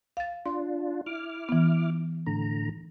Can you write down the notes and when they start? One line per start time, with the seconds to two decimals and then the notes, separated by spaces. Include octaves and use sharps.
0.17 F5 A6
0.46 D4 F4 C6
1.06 E4 D6 F6
1.49 E3 B3
2.26 A2 D3 A#5